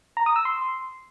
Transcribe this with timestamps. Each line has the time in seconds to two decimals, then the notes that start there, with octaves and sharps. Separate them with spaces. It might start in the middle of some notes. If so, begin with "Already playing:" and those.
0.17 A#5
0.26 D#6
0.36 E6
0.45 C6